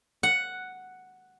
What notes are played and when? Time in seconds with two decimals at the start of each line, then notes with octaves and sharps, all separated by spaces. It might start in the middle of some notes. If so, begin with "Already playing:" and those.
0.23 F#5